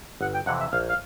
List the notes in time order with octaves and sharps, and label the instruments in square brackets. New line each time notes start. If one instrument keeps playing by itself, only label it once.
[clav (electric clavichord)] G1 [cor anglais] F#5
[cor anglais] G5
[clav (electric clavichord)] F2 C3 E3 [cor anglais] F#5
[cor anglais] E5
[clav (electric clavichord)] A#1 [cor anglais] F5
[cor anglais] F5